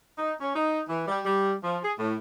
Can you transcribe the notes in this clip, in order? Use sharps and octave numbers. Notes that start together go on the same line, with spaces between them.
D#4
C#4
D#4
E3
G3
G3
F3
G#4
A2